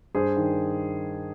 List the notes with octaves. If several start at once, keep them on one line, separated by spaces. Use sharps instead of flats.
G2 G#4 C5
D#3